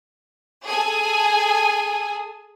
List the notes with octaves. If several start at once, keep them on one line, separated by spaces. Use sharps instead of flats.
G#4 A4 G#5